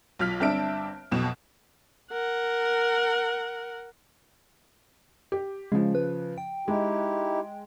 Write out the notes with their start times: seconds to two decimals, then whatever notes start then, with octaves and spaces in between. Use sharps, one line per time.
0.19 B1 F4 F6 B6
0.40 G1 C4 D4 E5 A5 D7
1.11 B1 F2 B2 E7
2.12 A#4 F#5
5.32 G4
5.72 C#3 F3 G#3
5.95 B4
6.38 G5
6.68 G#3 D#4 E4 G4